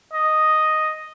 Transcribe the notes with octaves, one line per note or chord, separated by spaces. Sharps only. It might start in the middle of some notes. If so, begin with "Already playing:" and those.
D#5